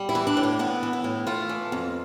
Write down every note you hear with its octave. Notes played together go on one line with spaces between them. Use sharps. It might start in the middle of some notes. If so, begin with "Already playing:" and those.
Already playing: G3
E4
E3
D4
A2
D4
B3 E4
E3
E4
A2
A3 F4
E3
F2